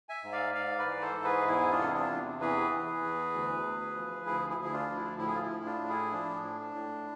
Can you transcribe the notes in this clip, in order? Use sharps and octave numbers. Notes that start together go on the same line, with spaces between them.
E5 G#5
G#2
D5 F5
G#2 D5 F5
B4 D5
E3
A4 C5
G#2
G#4 B4
E2 E4 G#4
D4 F4
C3 A4
G#4
D4 F4
E2
E3 G#4 B4
E3
E2
D2
D2
F3
D2 E4 G#4
E4 G#4
D2
E4
D4 F4
F3
E4
A2 E4
G#4
F4
E4
A2
D4 F4
A2
E4 G#4
F3 D4
A2
A2